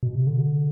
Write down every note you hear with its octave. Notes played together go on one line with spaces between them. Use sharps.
B2
C3
D3